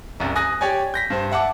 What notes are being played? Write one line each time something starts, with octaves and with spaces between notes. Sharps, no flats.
F#1 C2
G#5 D#6 F#6 A#6
G4 C#5 D5 G#5
G6 A#6 B6
G2 C5
E5 F#5 A5 D6